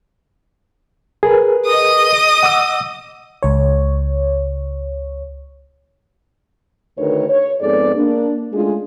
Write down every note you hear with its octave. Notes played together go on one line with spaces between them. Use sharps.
G#4 A#4 B4
D#5 D#6
F#5 D6 E6
C#2 C#5
D2 D#3 G#4 A#4 B4 C#5
C#5
F2 G#2 B3 G#4 A4 D5
A#3 D4
G#3 A3 C#4 D4 F4 G#4